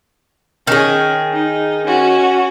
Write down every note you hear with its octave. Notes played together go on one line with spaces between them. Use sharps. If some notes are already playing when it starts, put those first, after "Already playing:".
D#3 C#4 G#4
D#4
C#4 F#4